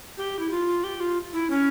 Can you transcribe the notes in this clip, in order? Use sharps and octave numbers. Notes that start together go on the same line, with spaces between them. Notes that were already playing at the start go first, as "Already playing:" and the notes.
G4
E4
F4
G4
F4
E4
C#4